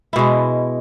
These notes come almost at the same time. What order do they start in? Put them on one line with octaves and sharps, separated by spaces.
E4 B2 G#3